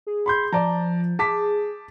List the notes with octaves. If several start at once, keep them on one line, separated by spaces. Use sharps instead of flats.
G#4
B5 C6 G6
F3 D5 A5 A#5
G#4 A5 D6 B6